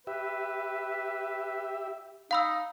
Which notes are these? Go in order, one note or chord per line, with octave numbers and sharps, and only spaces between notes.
G4 B4 E5
D#4 F5 B5 E6